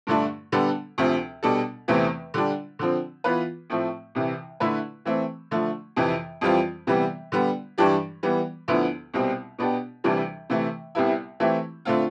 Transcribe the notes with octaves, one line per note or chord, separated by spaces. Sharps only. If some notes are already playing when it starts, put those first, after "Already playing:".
G2 D3 A3 D4
D3 G3 B3 D4 A4
D2 C3 F3 C4
B2 G3 D4 A4
E2 C3 E3 A3 C4
D3 G3 D4
D3 F3 C4
E3 B3 F4 B4
A2 F3 A3 C4
C2 C3 E3
D3 A3 E4 B4
E3 A3 C4
D3 F3 A3
F2 C3 E3
F2 E3 G3 C4 F4
C3 E3 G3 B3
D3 G3 B3
G2 E3 G3 D4 G4
E3 G3 B3
D2 D3 F3 B3 E4
C2 B2 G3 C4
B2 B3 D4 G4
D2 C3 E3 G3 D4
C3 E3 A3
C2 C3 G3 B3 E4
E3 A3 C4 E4 G4
D3 A3 C4 F4